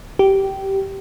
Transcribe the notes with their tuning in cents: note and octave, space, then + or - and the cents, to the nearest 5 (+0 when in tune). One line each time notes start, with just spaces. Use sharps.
G4 -15